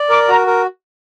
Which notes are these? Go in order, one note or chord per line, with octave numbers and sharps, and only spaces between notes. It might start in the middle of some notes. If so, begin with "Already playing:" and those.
Already playing: D5
A#4 D6
F#4 A#5
A#4